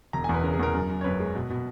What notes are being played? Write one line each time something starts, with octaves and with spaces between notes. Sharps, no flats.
E1 A#5
E2 G#5
B4
C#3 A#4
G#4
E2 A#4
F#2
F#2
C#5
F#1 B4
G#3
B2
B2